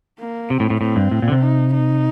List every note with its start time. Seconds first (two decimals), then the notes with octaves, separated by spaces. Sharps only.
0.19 A#3
0.50 C3 C4
0.60 A2
0.70 A2
0.81 A2 C4
0.96 G2
1.11 A2
1.22 A#2
1.28 D3
1.32 C3
1.42 D#4
1.73 D#4